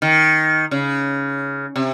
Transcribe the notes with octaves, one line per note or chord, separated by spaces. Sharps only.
D#3
C#3
C3